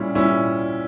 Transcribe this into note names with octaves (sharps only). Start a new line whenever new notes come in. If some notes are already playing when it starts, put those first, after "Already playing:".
Already playing: A#2 G3 C#4 E4
A#2 G3 C#4 E4